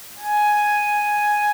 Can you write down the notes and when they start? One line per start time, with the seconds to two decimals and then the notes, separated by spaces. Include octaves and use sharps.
0.18 G#5